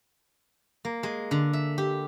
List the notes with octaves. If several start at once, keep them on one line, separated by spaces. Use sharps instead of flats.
A#3
G#3
D3
E5
G4